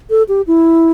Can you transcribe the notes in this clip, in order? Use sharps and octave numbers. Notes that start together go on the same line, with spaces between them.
A4
G4
E4